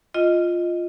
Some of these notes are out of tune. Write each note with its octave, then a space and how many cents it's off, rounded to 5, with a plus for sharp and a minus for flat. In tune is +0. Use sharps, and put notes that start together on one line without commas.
F4 +0 D#5 +0